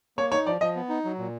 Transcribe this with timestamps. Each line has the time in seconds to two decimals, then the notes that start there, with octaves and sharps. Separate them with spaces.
0.17 A#3 C#5
0.31 D#4 C#5
0.46 F3 D5
0.61 F3 D#5
0.76 B3
0.89 D#4
1.05 F#3
1.18 A#2